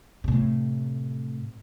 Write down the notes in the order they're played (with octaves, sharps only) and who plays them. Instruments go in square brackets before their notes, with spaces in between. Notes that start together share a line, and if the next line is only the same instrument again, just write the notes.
[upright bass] A2 C3